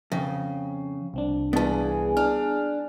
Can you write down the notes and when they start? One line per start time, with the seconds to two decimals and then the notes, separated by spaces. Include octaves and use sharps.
0.12 F2 C#3
1.14 C2 C4 D4
1.53 G2 E3 B3 G#4 A5
2.17 D4 F6